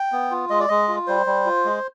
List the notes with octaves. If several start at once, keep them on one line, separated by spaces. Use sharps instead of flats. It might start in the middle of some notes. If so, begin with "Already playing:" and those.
Already playing: G5
B3
F4
G#3 D#5
D5
G#3 D#5
F4
G3 C5
G3
F4
G#3